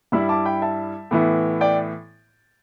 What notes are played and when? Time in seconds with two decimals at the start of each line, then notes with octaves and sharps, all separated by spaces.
0.12 G2 G3 E4 B5 E6
0.29 A5 D6
0.45 G5 B5
0.62 E5 A5
1.11 A2 E3 B3 E4
1.61 D5 G5